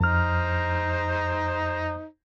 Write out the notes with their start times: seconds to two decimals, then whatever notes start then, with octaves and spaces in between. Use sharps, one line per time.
0.01 F2 D#4 C5 A#5 F6